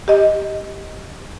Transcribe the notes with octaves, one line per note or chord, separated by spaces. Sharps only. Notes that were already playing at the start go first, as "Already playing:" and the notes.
G4 D#5